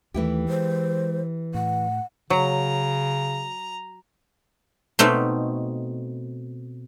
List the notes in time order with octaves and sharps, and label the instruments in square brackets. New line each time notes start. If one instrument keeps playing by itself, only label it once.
[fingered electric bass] D#2 D#3 A3 [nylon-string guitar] E3 E4 G4
[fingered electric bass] G#3 [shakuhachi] C5
[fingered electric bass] A2 [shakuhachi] F#5
[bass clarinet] C#3 [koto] F#3 [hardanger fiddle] A#5
[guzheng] B2 A3 C4 D#4